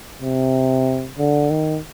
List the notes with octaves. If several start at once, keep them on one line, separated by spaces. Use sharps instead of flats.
C3
D3
D#3